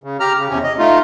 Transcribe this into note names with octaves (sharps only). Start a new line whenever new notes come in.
C#3
G4 A#5 F6
C#3
E2 C3 C#4
D#5
A3 D#4 F4